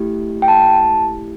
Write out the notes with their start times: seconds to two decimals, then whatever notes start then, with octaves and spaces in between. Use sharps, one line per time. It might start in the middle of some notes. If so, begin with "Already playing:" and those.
Already playing: A3 E4 G4
0.42 G5
0.48 A5